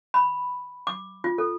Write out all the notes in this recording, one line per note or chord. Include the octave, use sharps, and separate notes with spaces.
B5
D6
F4
A4